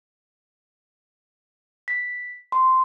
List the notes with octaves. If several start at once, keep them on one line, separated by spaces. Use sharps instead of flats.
B6
C6